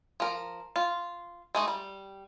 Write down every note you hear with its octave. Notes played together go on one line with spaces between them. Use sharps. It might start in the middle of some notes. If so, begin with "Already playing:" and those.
F3 A#4
F4
G#3 A3 D#4
G3